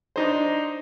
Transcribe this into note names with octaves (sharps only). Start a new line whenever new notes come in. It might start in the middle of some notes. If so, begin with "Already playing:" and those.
D4 D#4 C5